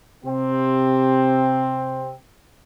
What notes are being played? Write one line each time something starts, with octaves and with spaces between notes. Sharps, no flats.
C3 C4